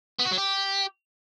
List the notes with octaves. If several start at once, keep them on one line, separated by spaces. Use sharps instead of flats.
B3
F#4
F#3
G4